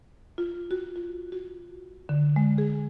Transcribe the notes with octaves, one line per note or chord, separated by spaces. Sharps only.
F4
F#4
F4
F#4
D3
G#3
G#4